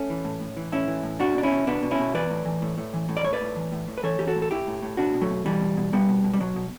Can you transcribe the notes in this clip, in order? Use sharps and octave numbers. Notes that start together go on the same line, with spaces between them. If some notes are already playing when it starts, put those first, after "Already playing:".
Already playing: A3 C#4
E3
A2
A2
E3
A2 C#4 E4
E3
A2
B2 D4 F#4
B2 D4
C#4 E4
B2
B2 B3 D4
B2
C#4 E4
B2
E3 B4 D5
A2
E3
A2
A2
E3
A2
D5
A2 C#5
B4 D5
A2
E3
A2
A2
B4
E3 A4 C#5
E3 G4
F#4 A4
A2
A4
A2 E4 G4
A2
A2
B2 D4 F#4
B2
F#3 A3
B2
B2 E3 G3
B2
B2
B2 G3 B3
B2
B2
G3
B2 F#3
B2